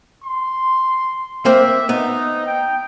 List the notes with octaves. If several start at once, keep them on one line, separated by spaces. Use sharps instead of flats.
C6
A#3 C4 C5 E5
B3 D#4
G5